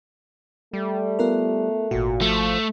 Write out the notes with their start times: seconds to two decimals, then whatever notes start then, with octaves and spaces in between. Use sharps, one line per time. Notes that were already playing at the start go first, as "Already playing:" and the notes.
0.73 G3 A3
1.19 B3 F4 A#4
1.91 G#1 A#2 F#4
2.21 F3 A3